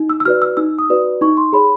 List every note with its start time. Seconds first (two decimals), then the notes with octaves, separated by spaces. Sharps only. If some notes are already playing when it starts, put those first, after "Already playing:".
Already playing: D#4
0.10 E6
0.20 E6
0.25 F#4 B4 D5 F6
0.42 E6
0.57 D#4 E6
0.79 D#6
0.90 F#4 B4 D5
1.21 D#4 C#6
1.37 C6
1.53 G#4 C#5 B5